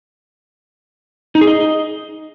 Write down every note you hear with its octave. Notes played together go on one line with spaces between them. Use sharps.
D#4
G#4
D#5